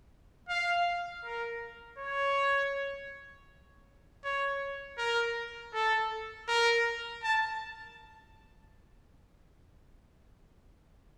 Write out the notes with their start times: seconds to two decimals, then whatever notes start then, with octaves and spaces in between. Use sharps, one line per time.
0.49 F5
1.25 A#4
1.99 C#5
4.24 C#5
4.98 A#4
5.74 A4
6.48 A#4
7.23 A5